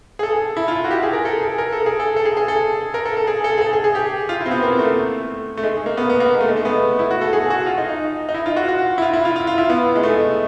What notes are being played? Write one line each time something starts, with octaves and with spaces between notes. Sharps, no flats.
G#4
A4
E4
F4
F#4
G4
G#4
A#4
A4
G#4
A#4
A4
G#4
A4
A4
G#4
G#4
A4
A#4
A4
A4
G#4
A4
G#4
A4
G#4
G#4
G4
F4
E4
C4
B3
A#3
A3
A3
G#3
A#3
B3
B3
A#3
G#3
A3
G#3
A3
B3
E4
F#4
A4
G#4
F#4
F4
D#4
D#4
D#4
E4
F4
F#4
F#4
E4
F4
E4
F4
F4
F4
E4
B3
G#3
A3